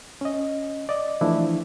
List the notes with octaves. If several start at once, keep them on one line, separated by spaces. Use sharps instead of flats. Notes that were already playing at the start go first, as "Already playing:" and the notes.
C#4 D#5
D5 D#5
E3 F3 A3 D4 E4